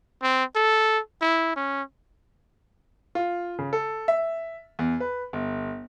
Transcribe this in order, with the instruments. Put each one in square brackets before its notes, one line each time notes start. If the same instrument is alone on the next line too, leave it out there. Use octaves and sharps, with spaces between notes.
[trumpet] C4
A4
E4
C#4
[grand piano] F4
C#3
A4
E5
E2
B4
G1